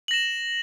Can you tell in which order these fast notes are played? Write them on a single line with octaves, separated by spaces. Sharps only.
F#7 A#6 E7